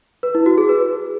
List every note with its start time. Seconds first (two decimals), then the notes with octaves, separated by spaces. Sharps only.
0.23 B4
0.35 E4
0.46 F#4
0.58 G#4
0.69 B4